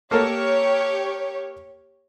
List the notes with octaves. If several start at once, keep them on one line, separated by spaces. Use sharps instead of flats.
A#3 G4 A4 A#4 C#5